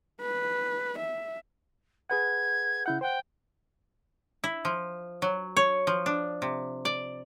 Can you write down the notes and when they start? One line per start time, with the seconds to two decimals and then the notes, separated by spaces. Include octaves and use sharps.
0.21 B4
0.99 E5
2.10 G#4 B4 F#5 G#6
2.86 C#3 E4 F#5 G6
3.01 C5 F#5 G5
4.44 E4
4.65 F3
5.22 F#3
5.57 C#5
5.87 F3
6.06 D4
6.42 C3
6.85 D5